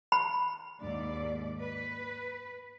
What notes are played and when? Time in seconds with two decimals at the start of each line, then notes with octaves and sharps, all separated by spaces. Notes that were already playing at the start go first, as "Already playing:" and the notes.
0.12 B5
0.81 D#2 G#2 D5
1.61 B4